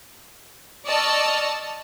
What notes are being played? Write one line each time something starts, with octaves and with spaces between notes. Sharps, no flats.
D5 D#5 A5 C#6 E6 F6